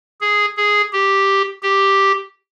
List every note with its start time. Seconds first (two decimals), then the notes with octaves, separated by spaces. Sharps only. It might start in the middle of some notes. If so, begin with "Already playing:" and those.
0.21 G#4
0.57 G#4
0.93 G4
1.63 G4